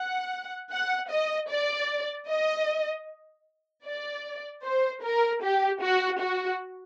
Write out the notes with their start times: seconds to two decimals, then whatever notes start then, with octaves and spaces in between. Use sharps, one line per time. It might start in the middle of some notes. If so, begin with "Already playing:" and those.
Already playing: F#5
0.72 F#5
1.11 D#5
1.50 D5
2.28 D#5
3.86 D5
4.64 C5
5.03 A#4
5.43 G4
5.82 F#4
6.20 F#4